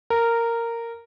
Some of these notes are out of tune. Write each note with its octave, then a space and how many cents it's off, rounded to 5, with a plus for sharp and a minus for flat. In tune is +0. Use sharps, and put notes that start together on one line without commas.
A#4 -10